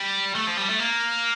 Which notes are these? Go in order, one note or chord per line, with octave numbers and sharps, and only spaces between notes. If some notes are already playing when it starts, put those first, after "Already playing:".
Already playing: G3
A3
F3
G3
A3
A#3